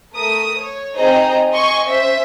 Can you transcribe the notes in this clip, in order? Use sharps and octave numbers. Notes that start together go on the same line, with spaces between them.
A3 A#4 D#6
C#5
C4 D#4 G#4 C5 D#5 A#5
D#5 G#5 C6 C#6
C#4 C5 E5